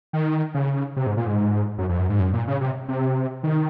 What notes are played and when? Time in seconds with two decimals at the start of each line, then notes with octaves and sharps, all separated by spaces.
0.13 D#3
0.54 C#3
0.96 C3
1.07 G#2
1.17 A#2
1.27 G#2
1.78 F#2
1.89 F2
1.99 F#2
2.10 G#2
2.20 F#2
2.33 A#2
2.48 C#3
2.61 C3
2.88 C3
3.43 D#3